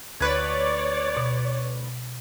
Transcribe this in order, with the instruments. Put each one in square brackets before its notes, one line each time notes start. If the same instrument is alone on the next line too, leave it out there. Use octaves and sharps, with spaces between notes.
[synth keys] D2 B4 [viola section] C#5 D5 [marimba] F#6 G#6
[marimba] B2